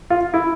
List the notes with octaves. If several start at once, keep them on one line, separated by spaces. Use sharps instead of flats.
F4
E4